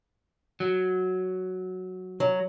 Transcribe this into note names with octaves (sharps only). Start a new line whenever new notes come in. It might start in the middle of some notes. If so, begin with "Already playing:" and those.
F#3
F#3